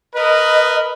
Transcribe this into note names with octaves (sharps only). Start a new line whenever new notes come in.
A#4 B4 D#5